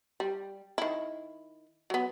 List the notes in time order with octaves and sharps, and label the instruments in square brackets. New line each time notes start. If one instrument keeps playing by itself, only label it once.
[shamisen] G3
D#3 E4
F#3 B3